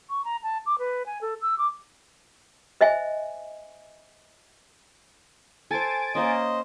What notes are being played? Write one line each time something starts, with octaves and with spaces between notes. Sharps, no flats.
C#6
A#5
A5
D6
B4
G#5
A4
E6
D6
C5 D#5 E5 G#5
A4 C5 G#5 A6 D7
A#3 C#4 C5 D#5